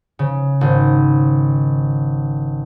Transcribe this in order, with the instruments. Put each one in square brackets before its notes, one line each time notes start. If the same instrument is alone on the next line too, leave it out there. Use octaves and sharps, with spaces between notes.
[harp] C#3
G#1